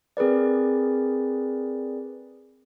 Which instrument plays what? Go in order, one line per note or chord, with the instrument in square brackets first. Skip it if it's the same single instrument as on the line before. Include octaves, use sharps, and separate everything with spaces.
[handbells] C4 G#4 A#4 B4 D5